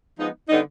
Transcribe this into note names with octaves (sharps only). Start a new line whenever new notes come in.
F3 G#3 B3 D#4
D3 G3 B3 D#4